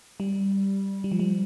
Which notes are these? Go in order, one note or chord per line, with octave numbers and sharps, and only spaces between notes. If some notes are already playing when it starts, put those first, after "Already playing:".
G3
G3
F3
G3